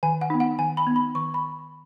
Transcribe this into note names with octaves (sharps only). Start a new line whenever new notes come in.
D#3 G#5
F#5
B3 D#4
F#5
D#3 G#5
B5
B3 D#4
B5
D#3 C#6
B5